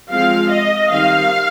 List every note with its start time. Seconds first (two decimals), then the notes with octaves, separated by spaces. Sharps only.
0.11 F3 G#3 C4 F5
0.50 D#5
0.90 D#3 G3 C4 F5